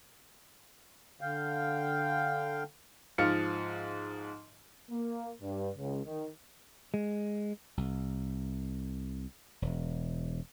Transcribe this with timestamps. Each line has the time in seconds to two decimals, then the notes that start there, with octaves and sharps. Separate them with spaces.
1.21 D3 F5 G5
3.18 G#2 F3 F5 F6 C#7
4.91 A#3
5.41 G2
5.77 C#2
6.05 D#3
6.94 G#3
7.77 C2
9.62 E1